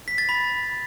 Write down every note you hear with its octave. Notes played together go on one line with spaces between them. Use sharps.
B6
A6
B5